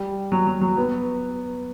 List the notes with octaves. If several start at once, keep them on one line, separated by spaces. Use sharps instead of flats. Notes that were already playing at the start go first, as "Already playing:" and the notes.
Already playing: G3
F#3
F#3
F#3
B3